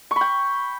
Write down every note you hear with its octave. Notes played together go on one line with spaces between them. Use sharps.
C#6
B5
G5